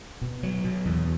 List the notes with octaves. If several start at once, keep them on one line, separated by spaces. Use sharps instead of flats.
B2
F#3
B2
E2